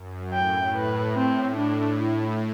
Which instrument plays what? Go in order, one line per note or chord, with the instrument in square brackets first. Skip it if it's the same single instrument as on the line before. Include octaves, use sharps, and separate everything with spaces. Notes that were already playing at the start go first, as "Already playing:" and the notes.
Already playing: [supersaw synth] F#2
[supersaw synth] A2 [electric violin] G5
[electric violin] B4
[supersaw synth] A2 [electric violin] C4
[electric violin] D4
E4